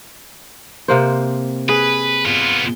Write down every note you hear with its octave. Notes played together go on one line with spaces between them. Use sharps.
C3 A#3 C5
G#4 B4
B3 F4